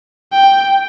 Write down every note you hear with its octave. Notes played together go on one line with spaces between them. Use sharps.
G5